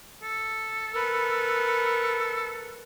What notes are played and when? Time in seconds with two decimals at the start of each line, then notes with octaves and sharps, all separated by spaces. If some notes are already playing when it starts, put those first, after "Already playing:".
0.23 A4
0.92 A#4 B4